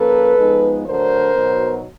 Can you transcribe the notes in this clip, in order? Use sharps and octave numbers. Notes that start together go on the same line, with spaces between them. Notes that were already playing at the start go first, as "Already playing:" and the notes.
Already playing: F3 A#3 C#4 A4 B4
F3 G#3 B3 D#4
D3 F#3 A3 D4 A#4 C5
B2 F#3 B3 D#4